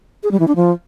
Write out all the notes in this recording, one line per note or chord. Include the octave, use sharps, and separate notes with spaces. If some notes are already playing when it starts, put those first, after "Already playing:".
G#4
G3
E3
D4
F3